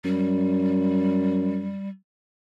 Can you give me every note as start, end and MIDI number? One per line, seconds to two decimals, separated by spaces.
0.05 1.76 42
0.05 1.89 55